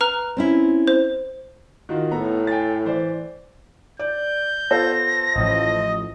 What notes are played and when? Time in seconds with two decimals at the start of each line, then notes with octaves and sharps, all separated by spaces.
0.01 B4 A#5 F6
0.37 C4 C#4 E4
0.87 C5
1.89 D#3 F4 F#4
2.11 A2 B3 A4 A#5
2.47 G5 G#5 A6
2.85 E3 C5 D5
3.99 D5 G6
4.71 B3 F4 A4 C5 A#6
5.36 A1 A2 F3 D#5